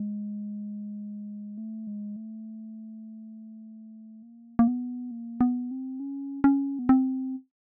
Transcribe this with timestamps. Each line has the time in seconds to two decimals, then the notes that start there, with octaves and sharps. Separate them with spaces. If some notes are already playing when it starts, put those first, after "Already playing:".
Already playing: G#3
1.58 A3
1.87 G#3
2.16 A3
4.23 A#3
4.59 A#3
4.68 B3
5.11 A#3
5.41 B3
5.71 C4
6.00 C#4
6.44 C#4
6.79 B3
6.89 C4